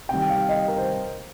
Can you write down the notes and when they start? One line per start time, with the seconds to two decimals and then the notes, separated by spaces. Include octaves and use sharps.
0.09 C3 D#3 G3 G5
0.29 F5
0.49 D#5
0.68 A#4
0.78 C5